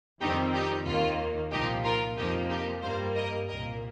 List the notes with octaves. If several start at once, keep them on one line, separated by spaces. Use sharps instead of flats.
F2 D#3 G3 C4 D#4 G4
D#4 G4
D#2 D#3 A#3 F4
C2 A#2 F3 D#4 G4
F4 A#4
F2 F3 A#3 D#4 G4
D#4 G4
G2 G3 A#3 C5 F5
A#4 D#5
C2 A#2 A#3 A#4 D#5